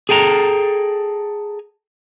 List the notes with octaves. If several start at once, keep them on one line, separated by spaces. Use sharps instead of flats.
G#4 A4 G5 A5 A#5